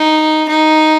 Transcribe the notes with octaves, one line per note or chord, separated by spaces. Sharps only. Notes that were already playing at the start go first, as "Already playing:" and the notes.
Already playing: D#4
D#4